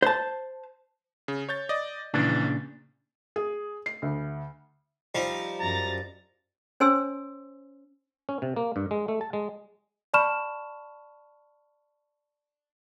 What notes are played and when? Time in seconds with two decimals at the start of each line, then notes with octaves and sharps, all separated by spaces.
0.02 C5 A5
1.28 C#3
1.49 C#5 G6 A6
1.69 D5 D#5
2.14 A#1 A#2 C#3 E3 D4
3.36 G#4
3.86 C7
4.02 D2
5.15 F3 G3 D#4
5.61 F#2 A#5 A6
6.80 C#4 C5 C#5 G#5 C6 E6
8.29 C#4
8.42 C3
8.56 A#3
8.76 G2
8.91 G#3
9.08 A3
9.21 A5
9.33 G#3
10.14 D5 A5 B5 C#6 F6 E7